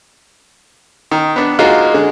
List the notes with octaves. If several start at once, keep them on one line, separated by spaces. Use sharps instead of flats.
D#3
B3 D4
G#3 A#3 D#4 F4 F#4
D3 G#3